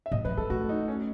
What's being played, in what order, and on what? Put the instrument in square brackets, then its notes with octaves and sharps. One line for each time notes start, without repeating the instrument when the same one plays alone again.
[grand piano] E5
[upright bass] A2 [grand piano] D#5
[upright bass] F#3 [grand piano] B4
[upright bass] G#3 [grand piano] A4
[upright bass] A3 [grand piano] F#4
[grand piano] D#4
C#4